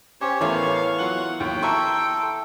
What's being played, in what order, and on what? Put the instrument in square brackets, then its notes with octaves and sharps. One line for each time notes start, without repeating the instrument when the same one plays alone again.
[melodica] C#4 G4 [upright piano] C5 [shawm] C#5
[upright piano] A1 A4 A#4 [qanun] E3 B3 C#5 [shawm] F5 [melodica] C#6
[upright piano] F#3 F4 F#7 [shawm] F#5
[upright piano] D#2 [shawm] G5
[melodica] A4 [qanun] E5 G#5 [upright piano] A#5 C6 C#6